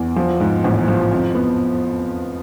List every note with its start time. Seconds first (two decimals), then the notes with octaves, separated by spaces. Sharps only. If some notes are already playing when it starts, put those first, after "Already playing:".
Already playing: E2
0.16 F3
0.40 G#2
0.64 A1
0.88 F3
1.12 F2
1.35 B3